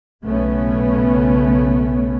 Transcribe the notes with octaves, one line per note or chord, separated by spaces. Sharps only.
B1 C#3 A3 B3 C#4